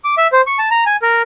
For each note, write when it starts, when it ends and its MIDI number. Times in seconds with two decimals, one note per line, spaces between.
0.04 0.15 86
0.17 0.27 76
0.32 0.41 72
0.47 0.58 85
0.58 0.69 81
0.71 0.84 82
0.86 0.96 80
1.02 1.22 70